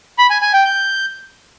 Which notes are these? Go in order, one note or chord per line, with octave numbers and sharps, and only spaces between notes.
B5
G#5
G#5
G5
G6